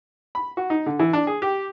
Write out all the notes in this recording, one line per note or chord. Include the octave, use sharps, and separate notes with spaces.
B5
F#4
D#4
D3
E3
D4
G#4
G4